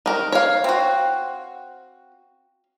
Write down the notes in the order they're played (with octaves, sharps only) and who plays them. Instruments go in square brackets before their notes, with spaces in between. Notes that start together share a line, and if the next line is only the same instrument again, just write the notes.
[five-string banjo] D#3 A#4
C#5 F5
[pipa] C4 F#4